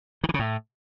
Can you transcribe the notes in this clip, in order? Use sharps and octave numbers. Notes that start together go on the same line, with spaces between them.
D#3
E3
C#3
A2